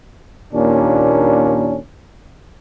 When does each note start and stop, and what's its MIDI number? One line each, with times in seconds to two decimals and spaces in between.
0.53 1.77 39
0.53 1.77 46
0.53 1.77 61
0.53 1.77 62